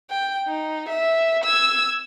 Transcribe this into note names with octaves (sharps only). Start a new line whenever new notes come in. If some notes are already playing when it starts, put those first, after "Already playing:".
G5
D#4
E5
E6 G#6